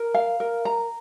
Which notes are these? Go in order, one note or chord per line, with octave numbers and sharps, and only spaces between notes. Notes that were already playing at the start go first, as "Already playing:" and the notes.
Already playing: A#4
F5
A#4
A#5